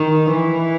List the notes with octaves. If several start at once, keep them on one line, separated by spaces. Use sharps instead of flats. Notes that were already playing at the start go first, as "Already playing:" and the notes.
Already playing: D#3
E3